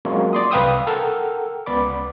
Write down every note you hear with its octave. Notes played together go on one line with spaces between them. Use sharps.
F#3 G#3 A#3 C4 C#4 F4
D5 C6 D#6
C2 B4 F5 G5 D#6 E6
A4 A#4 F#5 G5 E6 F6
C#2 B3 D5 B5 D6